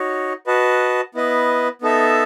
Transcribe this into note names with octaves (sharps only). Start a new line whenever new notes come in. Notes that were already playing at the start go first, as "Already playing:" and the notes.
Already playing: D#4 F#4 C#5
F#4 B4 D#5 A5
B3 E4 B4 D#5
B3 D#4 A4 E5 A5